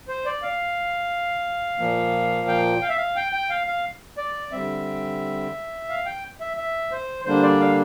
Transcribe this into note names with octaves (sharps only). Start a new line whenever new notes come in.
C5
D5
F5
A#2 F3 A#3
G5
F5
E5
F5
G5
G5
F5
F5
D5
D3 G3 C4 E5
F5
G5
E5
E5
C5
D3 G3 A#3 D4 C5
D5
F5